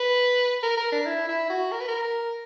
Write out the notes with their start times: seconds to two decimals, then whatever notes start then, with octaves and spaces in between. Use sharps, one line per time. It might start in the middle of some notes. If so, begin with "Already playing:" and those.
Already playing: B4
0.63 A#4
0.77 A#4
0.92 D4
1.06 E4
1.28 E4
1.50 F#4
1.72 A#4
1.80 B4
1.88 A#4